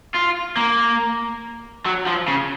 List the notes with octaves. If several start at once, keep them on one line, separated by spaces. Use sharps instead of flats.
F4
A#3
F#3
F3
C#3